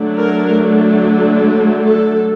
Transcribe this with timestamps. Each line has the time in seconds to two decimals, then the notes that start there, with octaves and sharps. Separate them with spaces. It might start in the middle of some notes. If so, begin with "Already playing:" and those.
Already playing: D3 F#3 A3 D4
0.17 A#4
1.84 A4